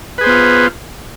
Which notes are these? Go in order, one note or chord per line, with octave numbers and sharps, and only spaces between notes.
B3 F4 G#4 B4 C5